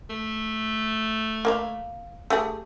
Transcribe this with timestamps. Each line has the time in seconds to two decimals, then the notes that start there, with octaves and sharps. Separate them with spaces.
0.10 A3
1.45 A#3 E5 F5
2.30 A3 G4 G#4